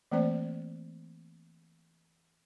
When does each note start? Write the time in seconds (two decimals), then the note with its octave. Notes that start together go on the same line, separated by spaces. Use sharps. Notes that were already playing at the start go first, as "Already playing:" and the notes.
0.11 E3 A3 A#3 C4 C5 D5